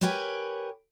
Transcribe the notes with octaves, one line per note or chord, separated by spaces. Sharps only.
G4 A#4 B4 C#5 G5 G#5